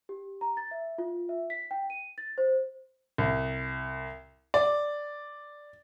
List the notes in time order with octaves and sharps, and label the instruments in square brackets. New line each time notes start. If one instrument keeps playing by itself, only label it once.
[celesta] G4
A#5
A6
E5
F4
E5
B6
G5
D#7
A6
C5
[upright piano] C2
D5